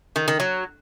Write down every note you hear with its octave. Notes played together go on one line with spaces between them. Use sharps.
D#3
D#3
F#3